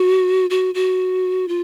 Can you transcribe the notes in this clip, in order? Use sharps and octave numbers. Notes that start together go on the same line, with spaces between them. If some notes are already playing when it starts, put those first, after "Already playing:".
Already playing: F#4
F#4
F#4
F4